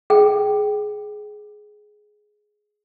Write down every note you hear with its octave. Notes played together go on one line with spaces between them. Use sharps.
G#4 G5